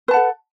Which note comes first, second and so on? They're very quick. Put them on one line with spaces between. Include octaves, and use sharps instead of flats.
B4 A5 F#5 A4